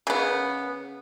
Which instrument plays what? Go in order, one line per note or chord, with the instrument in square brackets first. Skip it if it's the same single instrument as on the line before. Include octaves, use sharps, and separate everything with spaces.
[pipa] C#3 B3